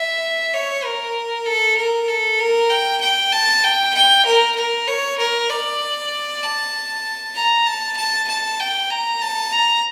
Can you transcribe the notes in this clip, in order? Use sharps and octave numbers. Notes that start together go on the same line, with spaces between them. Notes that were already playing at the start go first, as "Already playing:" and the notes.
Already playing: E5
C#5
A#4
A4
A#4
A4
A#4
G5
G5
A5
G5
G5
A#4
A#4
C#5
A#4
D5
A5
A#5
A5
A5
A5
G5
A#5
A5
A#5